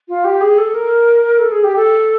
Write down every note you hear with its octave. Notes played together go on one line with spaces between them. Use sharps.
F4
G4
G#4
A4
A#4
A4
G#4
G4
A4